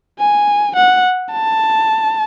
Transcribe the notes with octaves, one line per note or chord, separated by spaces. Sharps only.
G#5
F#5
A5